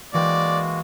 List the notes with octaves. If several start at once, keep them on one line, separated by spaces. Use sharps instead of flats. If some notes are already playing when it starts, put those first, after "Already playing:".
E3 G#3 A#3 F#4 D5 G5